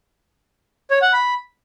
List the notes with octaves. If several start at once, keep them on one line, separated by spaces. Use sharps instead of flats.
C#5
F#5
B5